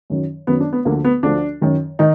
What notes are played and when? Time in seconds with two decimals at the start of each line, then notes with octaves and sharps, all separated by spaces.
0.10 F#2 D#3 F#3
0.47 F#2 D#3 F#3 B3
0.60 D4
0.73 B3
0.85 D2 D3 F3 A#3
1.05 B3
1.23 D2 D3 F3 D4
1.61 F#2 D#3 F#3
1.99 D#3 D#4